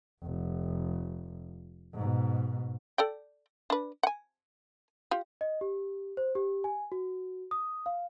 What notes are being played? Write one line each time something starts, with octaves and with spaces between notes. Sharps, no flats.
F1
G#2 B2
A4 D5 G5
D4 B4
F#5 G#5
F4 G4
D#5
G4
C5
G4
G#5
F#4
D#6
F5